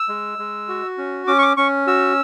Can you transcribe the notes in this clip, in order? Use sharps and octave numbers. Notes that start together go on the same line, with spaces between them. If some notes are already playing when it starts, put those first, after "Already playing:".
Already playing: E6
G#3
G#3
F#4
C#4
C#4 D6
C#6
D6
C#4 C#6
F#4 E6